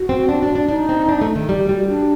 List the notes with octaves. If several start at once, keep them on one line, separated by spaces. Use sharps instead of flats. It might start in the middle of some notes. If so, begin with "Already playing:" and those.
Already playing: F#4
C4
D4
D4
D4
D4 D#4
C4
D4
A3
D#3
G3
G3
F#4
D4